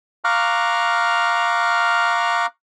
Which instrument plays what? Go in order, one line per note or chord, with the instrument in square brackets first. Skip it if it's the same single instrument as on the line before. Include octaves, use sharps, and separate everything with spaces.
[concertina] F5 A#5 C#6 D6 F6 F#6